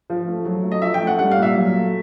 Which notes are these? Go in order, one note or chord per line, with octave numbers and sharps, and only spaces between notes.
F3
A3
F#3
A3
D#5
F3 E5
G5
A3
F#5
G3 F#5
F5
A#2
E5
F#3
A3